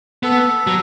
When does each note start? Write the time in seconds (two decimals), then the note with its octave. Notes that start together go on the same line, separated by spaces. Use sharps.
0.23 B3 A4
0.67 F#3